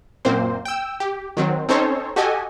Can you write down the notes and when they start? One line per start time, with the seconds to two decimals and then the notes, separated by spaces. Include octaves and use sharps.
0.25 F#2 A#2 A#3 C4 C5
0.65 G5 E6
1.00 G4
1.37 D#3 F#3 C4
1.69 C4 C#4 D#4 A4 C5 C#5
2.16 F#4 G4 A4 D#5 G#5